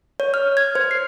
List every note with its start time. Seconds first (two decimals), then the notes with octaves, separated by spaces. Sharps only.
0.20 C#5
0.34 F6
0.57 G#6
0.75 C5
0.91 C7